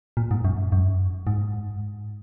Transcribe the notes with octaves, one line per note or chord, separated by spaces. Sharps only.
A#2
G#2
F#2
F#2
G#2